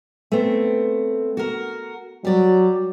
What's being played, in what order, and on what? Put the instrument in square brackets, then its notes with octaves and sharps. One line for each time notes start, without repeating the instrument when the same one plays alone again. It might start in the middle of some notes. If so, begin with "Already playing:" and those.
[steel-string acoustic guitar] A3 B3 C4
F#4 A#4
[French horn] F#3 [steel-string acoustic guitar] G3 D5